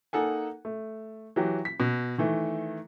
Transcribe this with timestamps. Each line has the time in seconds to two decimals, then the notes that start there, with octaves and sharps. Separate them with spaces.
0.13 A#3 D#4 A4 F#5 G#5
0.65 A3
1.36 E3 F#3 G4
1.65 B6
1.80 B2
2.18 D#3 E3 A3